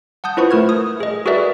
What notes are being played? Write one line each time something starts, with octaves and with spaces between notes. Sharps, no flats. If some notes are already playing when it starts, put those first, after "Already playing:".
F#5 A5 D#6 G6
E4 F4 B4 C5 C#6
A3 A#4 F6 G#6
D#6
G#4 D#5
F#4 G#4 A#4 B4 D5 E5